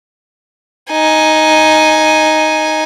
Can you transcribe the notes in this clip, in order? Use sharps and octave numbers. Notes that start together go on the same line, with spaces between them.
D#4 G#5